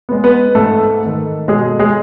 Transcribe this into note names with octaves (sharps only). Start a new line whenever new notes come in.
G#3 B3
B3 B4
G#2 A3 A4
D#3 A3
B2 G#3 G#4
G#3 G#4